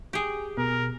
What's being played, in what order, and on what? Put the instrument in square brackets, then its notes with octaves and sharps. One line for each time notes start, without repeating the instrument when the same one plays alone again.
[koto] G4 G#4
[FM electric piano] B2 [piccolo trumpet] A#4